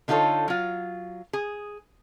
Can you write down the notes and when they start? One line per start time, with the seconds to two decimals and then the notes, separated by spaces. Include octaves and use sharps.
0.08 D3 D#4 F4 G4 A4 C#5
0.48 F#3 F4
1.33 G#4